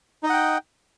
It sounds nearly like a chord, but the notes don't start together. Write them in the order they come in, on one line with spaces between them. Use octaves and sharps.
D#4 D#5 F#5 G5